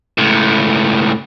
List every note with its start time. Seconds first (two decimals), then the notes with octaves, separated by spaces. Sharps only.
0.18 C#2 A2